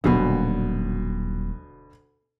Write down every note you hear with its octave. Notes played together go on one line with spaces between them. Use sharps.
D#1 D2 B2 F#3